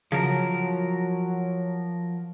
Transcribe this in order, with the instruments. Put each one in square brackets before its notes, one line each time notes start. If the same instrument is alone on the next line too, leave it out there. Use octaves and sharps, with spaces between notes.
[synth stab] C#3 [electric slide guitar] F3 A#4 [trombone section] F#3